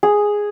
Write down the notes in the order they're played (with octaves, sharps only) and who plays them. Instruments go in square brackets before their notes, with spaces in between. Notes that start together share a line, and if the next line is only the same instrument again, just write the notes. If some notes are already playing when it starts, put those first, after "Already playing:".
[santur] G#4